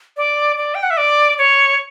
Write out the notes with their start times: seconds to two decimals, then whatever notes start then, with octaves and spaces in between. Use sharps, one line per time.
0.17 D5
0.57 D5
0.75 G5
0.83 F#5
0.91 E5
0.97 D5
1.38 C#5